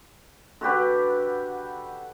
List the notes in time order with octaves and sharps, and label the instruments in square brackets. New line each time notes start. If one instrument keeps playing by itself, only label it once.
[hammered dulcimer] D3 F#4 G4 B4